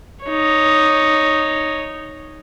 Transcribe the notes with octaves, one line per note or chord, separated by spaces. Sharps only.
D#4 C#5